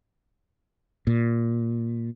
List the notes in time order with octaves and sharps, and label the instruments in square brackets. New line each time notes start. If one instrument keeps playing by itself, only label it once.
[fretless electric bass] A#2